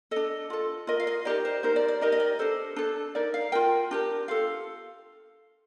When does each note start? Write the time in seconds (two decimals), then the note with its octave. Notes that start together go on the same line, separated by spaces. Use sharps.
0.11 D4 A4 D#5
0.50 F4 A4
0.87 F4 A#4 D#5
1.00 F5
1.07 D#5
1.25 D#4 G4 A#4 D5
1.45 C5
1.63 D#4 A#4 C5
1.76 D5
1.88 D5
2.01 D#4 G4 A#4 D#5
2.12 D#5
2.20 D5
2.39 D4 A4 C5
2.76 D4 A4
3.15 D#4 A#4 D5
3.34 F5
3.52 F4 A#4 G5
3.91 D4 G4 A#4
4.28 F4 A4 F5